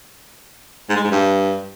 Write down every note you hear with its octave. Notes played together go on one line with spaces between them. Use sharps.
G#2
G#3
G#2
G2